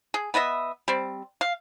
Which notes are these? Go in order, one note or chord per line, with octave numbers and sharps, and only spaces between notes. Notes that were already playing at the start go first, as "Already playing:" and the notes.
G#4
B3 B4 D#5 E5
G3 C4
F5